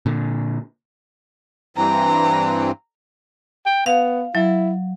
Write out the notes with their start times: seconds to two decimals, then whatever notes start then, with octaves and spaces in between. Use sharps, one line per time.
0.06 A#2 D3
1.77 G2 E3 C4 A#5
3.66 G5
3.86 B3 F5
4.35 F#3 E4